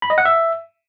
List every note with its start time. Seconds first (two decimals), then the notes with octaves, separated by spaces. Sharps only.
0.02 B5
0.10 D#5
0.18 F#5
0.25 E5